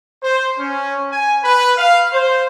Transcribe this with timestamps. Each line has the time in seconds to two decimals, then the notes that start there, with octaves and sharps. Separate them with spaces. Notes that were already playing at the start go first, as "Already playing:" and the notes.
0.22 C5
0.59 C#4
1.12 G#5
1.43 B4
1.77 F5
2.13 C5